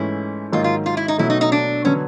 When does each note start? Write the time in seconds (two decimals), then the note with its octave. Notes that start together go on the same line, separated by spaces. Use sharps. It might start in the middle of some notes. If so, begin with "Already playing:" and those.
Already playing: G#2 E3 A3 C#4 E4
0.52 G#2 D#3 F#3 A#3 D#4 F4
0.64 F4
0.86 F4
0.97 E4
1.08 D#4
1.18 B2 F#3 A3 E4
1.30 D#4
1.41 D#4
1.52 D4
1.84 D3 F#3 B3 C#4